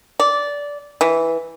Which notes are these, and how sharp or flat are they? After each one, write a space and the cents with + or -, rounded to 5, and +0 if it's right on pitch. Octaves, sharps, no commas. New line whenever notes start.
D5 -15
E3 -5